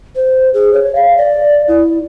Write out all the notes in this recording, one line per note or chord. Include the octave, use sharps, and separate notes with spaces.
C5
G#4
C#5
F5
D5
E4